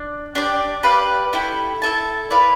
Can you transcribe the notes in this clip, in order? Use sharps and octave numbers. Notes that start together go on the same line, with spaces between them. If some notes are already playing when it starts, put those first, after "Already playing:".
Already playing: D4
D4 G4 D5
G4 B4 D5 F5
A3 E4 G4
E4 A4 E5 A5
E4 B4 D5 F5